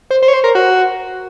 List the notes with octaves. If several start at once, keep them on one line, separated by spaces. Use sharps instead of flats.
C5
C5
C#5
C5
A#4
F#4